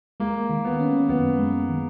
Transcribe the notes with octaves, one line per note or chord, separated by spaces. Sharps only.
G#3 A#3
D#3
B3
C#4
F#2 B3
G#3
D#3